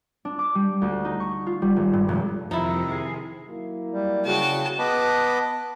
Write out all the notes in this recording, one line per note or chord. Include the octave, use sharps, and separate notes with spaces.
D4
D6
G3
D2
D#4
C#6
F4
G3
G#1
G2
F1
F2 C3 D#3 F3 D#4 E4
G#4
F#3 A#3 E4
G3
C#3 F#4 G5 A5
B3 B4 D#5 A5 B5 D6